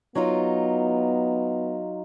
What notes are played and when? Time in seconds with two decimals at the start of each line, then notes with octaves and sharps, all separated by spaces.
0.15 F#3 B3 D#4 F4